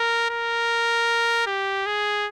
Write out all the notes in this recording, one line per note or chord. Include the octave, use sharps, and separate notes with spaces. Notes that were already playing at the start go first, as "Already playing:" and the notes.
Already playing: A#4
A#4
G4
G#4